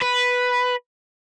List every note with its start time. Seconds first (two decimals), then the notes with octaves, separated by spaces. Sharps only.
0.02 B4